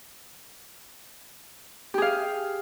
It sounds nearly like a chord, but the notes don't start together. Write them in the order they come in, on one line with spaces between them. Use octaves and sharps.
G4 G#4 F5